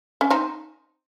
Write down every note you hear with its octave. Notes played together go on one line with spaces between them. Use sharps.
C#4
C4 D#4